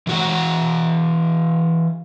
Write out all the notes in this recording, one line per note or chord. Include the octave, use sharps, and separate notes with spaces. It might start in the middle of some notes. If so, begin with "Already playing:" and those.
E3 F#4 F#5